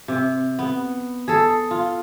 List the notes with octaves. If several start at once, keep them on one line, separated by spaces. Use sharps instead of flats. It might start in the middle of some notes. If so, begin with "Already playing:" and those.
C3
B3
G#4 A4
F4